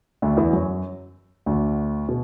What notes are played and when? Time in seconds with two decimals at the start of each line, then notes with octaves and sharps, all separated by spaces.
0.22 D2 D3
0.37 E2 E3
0.53 F#2 F#3
1.46 D2 D3
2.08 B2